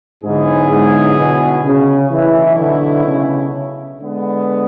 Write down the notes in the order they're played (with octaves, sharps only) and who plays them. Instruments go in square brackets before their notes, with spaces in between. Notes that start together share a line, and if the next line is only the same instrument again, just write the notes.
[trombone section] G#2 [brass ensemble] D3 F#3 B3 E4 G#4
[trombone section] G#2
B2
C#3
[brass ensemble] B1 B2 A3 E4 [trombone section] E3
[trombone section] D3
C#3
[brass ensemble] D3 G#3 B3